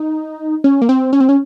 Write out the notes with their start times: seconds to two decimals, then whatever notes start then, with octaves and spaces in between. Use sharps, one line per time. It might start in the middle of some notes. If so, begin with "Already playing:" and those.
Already playing: D#4
0.64 C#4
0.82 A#3
0.89 C4
1.13 C#4
1.20 C4
1.29 C#4